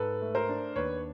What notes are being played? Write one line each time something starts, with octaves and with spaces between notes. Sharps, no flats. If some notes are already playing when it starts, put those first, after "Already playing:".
Already playing: G#2 A4 B4
A3
A#4 C5
D4
D#2 B4 C#5